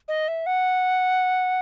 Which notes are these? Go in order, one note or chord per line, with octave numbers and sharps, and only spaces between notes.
D#5
E5
F#5